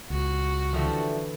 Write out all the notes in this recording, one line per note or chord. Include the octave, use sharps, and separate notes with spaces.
C#2 F#4
D3 E3 F3 G3 A3